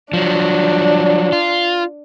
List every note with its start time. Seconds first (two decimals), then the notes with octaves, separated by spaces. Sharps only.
0.13 F3 F#3 D4
1.32 F4